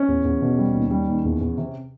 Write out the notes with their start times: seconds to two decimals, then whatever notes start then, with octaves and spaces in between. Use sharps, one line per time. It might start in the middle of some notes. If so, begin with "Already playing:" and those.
Already playing: C#4
0.08 E2
0.25 E2
0.42 B2
0.58 G3
0.75 D#2
0.91 G3
1.08 D#2
1.25 E2
1.41 E2
1.58 C3